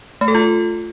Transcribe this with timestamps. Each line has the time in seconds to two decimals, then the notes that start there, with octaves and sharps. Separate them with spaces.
0.21 A3
0.28 A4
0.35 F4